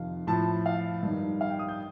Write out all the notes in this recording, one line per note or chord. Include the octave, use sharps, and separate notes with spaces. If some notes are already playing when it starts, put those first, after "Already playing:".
Already playing: F2 C3 D#3 F5
A2 F3 A5
F5
G2 D#3
F5
G5
D#6
G6